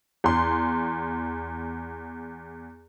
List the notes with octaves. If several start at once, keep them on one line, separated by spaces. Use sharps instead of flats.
E2 C6